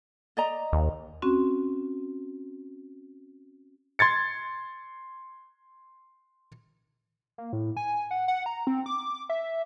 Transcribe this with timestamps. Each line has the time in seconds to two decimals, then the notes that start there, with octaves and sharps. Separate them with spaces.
0.37 D5 D#5 A#5
0.73 D#2
1.22 C4 C#4 F#4
3.99 C6 G#6 A6 C#7
7.38 A#3
7.53 A2
7.77 G#5
8.11 F#5
8.28 F#5
8.46 A#5
8.67 C4
8.86 D6
9.30 E5